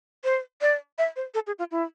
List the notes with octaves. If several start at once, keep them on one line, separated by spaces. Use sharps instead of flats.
C5
D5
E5
C5
A4
G#4
F4
E4